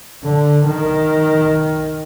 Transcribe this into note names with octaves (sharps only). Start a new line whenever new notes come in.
D3
D#3